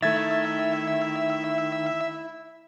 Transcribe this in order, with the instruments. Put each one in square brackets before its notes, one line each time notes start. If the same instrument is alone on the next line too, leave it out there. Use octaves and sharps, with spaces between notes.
[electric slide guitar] D#3 [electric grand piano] A3 G#6 A6 [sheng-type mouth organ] E4 [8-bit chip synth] E5